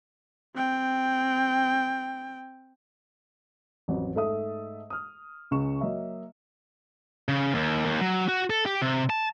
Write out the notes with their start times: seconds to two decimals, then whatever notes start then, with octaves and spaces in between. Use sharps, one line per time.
0.55 C4 G5
3.88 A1 F2 F#3
4.15 G#2 A3 A4 E5 D#6
4.90 D#6 F6
5.51 C#2 C#3 C#6 E7
5.81 F#3 A#3 D#5 E5
7.29 C#3
7.55 D#2
7.85 D#2
8.01 F#3
8.28 F#4
8.50 A4
8.66 G4
8.82 C3
9.10 A5